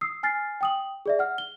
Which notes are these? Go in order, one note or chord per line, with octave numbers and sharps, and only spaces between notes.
D#6 E6 C7
G#5 F6 A6 C7
G5 D#6 F#7
G#4 D5 E5
F#5 F6
G7